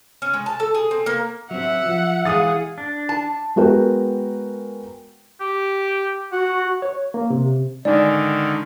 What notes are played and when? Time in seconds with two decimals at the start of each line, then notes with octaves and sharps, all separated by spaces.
0.22 C#4
0.34 G#3
0.46 A5
0.60 A4
0.75 G#4
0.91 C4
1.06 A#3
1.51 F#3 C4 E5 F#5
1.86 F3
2.25 E3 G#3 G#4 F5 D#6 A6
2.78 D4
3.09 A5
3.56 G#3 B3 F#4 A#4 G5
5.41 G4
6.32 F#4 F#5
6.82 C#5
7.14 A#3
7.30 C3
7.85 D3 D#3 G#3 D#4 D5 G#5